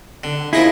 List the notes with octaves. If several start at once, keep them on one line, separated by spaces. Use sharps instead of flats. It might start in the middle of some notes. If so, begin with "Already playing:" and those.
D3
F3 A#3 D#4 E4 G#4